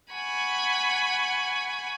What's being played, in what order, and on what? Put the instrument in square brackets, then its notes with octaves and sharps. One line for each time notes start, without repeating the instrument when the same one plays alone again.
[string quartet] F#5 G#5 B5 C#6